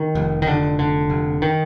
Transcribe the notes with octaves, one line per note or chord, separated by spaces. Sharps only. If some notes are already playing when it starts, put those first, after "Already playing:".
Already playing: D#3
F1
D#3
F1 D3
D3
F1
D#3